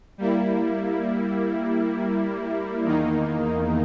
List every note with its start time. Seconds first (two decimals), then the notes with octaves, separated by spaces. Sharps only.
0.18 G3 A#3 E4
2.85 E2 D#3 A#3 D#4